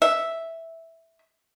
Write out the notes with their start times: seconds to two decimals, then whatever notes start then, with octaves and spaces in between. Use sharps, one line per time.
0.02 E5